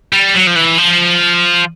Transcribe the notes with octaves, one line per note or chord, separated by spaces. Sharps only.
G3
F#3
F3
E3
F3